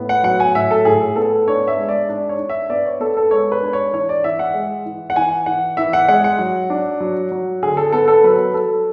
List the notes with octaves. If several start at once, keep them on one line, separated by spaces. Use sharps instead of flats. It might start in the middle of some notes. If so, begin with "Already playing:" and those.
Already playing: A2 B3
F#5
F#3 F#5
G#5
A2 E5
A4
A2 G#4
B3 A4
D4 C#5
E5
G#3
D5
D4
C#5
D4
E5
B3 D5
C#5
B3 A4
A4
G#3 C#5
B4
D4
C#5
E3 C#5
D5
E3 E5
F#5
G#3
E3
F#5
E3 G#5
E3 F#5
E3 E5
F#5
G#3 F#5
F#5
F#3
D4
F#3
F#3
D3 G#4
A4
B3 A4
A4
F#3 B4
F#3 A4